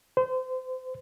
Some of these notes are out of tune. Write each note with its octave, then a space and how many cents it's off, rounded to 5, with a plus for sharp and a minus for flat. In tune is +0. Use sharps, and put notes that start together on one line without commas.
C5 -30